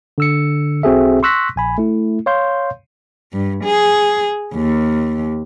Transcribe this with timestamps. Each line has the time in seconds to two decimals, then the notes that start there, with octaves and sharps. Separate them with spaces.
0.18 D3 E6 C#7
0.83 B1 C4 F#4 G#4 A4 E5
1.23 C6 C#6 E6 F#6 A#6 B6
1.56 A#1 G#5 B5
1.78 A3 E4
2.26 C#5 F5 C6 G6
3.33 G2
3.64 G#4
4.54 D#2